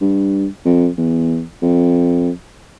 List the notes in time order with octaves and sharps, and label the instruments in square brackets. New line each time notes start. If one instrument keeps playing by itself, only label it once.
[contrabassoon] G2
F2
E2
F2